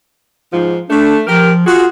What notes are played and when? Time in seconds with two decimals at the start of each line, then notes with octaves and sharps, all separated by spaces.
0.53 G#2 F3
0.90 A3 D4
1.27 F3 G4 A#4
1.67 F4 F#4 G#4